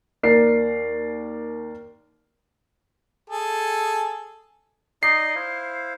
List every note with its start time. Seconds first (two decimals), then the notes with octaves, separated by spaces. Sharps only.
0.23 D#2 A#4 D5 C7
3.30 G#4 A4
5.03 D#4 D5 D#5 C7
5.35 E4 C5 F5